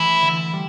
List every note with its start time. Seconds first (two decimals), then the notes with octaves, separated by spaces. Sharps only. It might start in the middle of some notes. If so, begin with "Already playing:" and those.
Already playing: E3 A3 E4
0.22 D3
0.53 G3